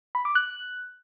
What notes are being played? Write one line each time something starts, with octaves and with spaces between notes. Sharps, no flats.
B5
D6
F#6